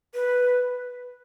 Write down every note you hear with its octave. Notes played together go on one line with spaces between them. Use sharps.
B4